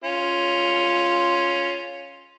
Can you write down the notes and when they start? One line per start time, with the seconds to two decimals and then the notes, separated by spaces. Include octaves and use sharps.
0.04 C#4 F4